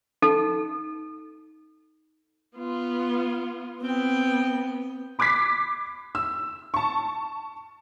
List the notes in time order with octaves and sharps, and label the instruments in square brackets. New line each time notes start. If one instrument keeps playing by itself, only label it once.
[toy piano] D#4 A4
[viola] B3 F4
[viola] B3 [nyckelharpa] C4 G5
[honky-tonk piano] B5 D6 F#6 G#6 B6 C7
E6
A5 C#6